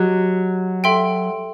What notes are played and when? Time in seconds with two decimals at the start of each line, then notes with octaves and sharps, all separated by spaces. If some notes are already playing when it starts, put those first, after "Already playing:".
Already playing: F#3 G4 D#5
0.84 A4 E5 G5 C6